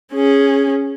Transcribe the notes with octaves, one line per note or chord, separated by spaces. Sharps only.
C#4 G#4